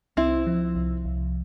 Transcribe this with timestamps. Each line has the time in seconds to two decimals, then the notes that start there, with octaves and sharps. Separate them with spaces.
0.17 C2 C4 E4
0.47 F3
0.75 C2
1.05 C2